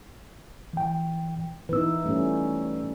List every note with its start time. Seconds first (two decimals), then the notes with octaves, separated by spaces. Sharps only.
0.73 E3 G5
1.69 E3 B3 D#4 B4 E6
2.05 G3 A3 C#4